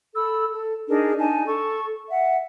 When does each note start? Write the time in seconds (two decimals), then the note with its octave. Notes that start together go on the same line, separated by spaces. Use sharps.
0.15 A4 B5 E6
0.51 A4
0.88 D4 D#4 G#4 A#4
1.18 D4 D#4 G#5 A5
1.47 A4 C#6
2.10 E5 F#5